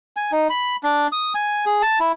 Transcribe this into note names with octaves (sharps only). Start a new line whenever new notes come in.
G#5
D#4
B5
D4
D#6
G#5
G#4
A5
E4